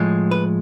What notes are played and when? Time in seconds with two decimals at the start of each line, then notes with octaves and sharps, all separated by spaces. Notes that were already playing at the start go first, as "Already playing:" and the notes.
Already playing: A2 F3 G#3
0.31 B4